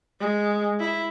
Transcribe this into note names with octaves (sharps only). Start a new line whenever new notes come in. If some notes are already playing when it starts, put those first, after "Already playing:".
G#3
E4